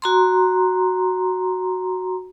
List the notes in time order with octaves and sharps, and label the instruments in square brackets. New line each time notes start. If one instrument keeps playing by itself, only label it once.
[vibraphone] F#4 A#5 C6